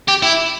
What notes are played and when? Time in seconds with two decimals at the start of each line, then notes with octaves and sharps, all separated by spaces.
0.08 G4
0.23 E4